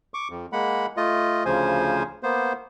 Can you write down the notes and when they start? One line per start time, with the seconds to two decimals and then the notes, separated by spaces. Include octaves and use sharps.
0.14 C#6 D6
0.30 F2
0.53 G#3 A#3 F#5 B5
0.97 A3 F4 D#5
1.46 D2 C#3 F3 C5 G#5
2.23 A#3 B3 C5